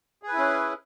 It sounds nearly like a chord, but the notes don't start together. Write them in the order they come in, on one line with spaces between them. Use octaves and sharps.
G#4 B4 E4 C#4